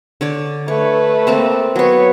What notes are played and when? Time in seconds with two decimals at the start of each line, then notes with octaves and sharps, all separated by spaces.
0.21 D3 C#5 D5
0.68 A3 B4 C#5
1.27 A#3 C4 A5
1.76 F#3 B3 B4 C#5